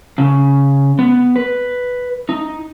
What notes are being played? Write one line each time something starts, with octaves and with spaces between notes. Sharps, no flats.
C#3
B3
B4
D#4